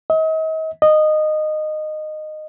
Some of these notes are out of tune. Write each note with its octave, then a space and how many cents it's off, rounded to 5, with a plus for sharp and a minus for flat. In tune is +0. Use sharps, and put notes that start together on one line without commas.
D#5 +40
D#5 -15